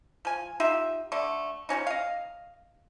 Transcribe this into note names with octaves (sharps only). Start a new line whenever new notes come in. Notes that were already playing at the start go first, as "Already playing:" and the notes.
F3 G#5
D#4 F4 G4 E5
D3 A3 D4
F3 G#3 C#4 D#4
D#5 F5